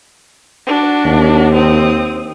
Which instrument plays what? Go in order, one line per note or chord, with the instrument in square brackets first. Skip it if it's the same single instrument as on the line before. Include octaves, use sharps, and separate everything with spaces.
[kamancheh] D4 F#4
[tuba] D#2
[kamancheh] C4 D#6